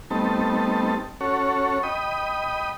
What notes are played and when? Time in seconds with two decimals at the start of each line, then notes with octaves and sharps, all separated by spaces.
0.11 G3 A3 B3 C4 D#4 A5
1.21 C#4 F#4 A4 C#5
1.83 D#5 G5 B5 D#6